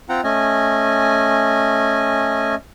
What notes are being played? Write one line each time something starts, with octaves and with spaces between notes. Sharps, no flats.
C4 F4 F#5 G5 A#5
A3 C#4 D#5 G#5